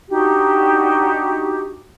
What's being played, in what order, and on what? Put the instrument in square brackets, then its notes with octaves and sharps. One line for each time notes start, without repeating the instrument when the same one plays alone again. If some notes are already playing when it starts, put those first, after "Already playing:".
[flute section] D4 D#4 F#4 G4